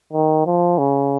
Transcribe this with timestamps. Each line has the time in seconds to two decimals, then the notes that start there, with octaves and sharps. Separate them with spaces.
0.13 D#3
0.46 F3
0.78 C#3